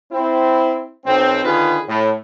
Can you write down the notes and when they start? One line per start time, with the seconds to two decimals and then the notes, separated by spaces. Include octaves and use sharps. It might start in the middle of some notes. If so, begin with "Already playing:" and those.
0.12 C4 E4
1.06 B1 C4
1.45 D3 D#3 F4 G#4 B4
1.88 A2